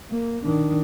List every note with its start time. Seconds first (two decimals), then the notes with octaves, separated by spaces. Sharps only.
0.11 A#3
0.46 D#3 D4